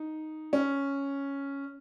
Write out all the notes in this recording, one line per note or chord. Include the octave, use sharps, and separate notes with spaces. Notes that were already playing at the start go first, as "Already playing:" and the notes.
Already playing: D#4
C#4